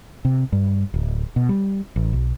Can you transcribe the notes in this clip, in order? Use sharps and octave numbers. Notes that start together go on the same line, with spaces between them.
C3
G2
D1
B2
G3
A1
B1